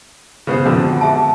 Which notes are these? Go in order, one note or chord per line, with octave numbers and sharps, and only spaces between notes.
C#3 B3 C5
F2 B2 D3
G#4 E5 A5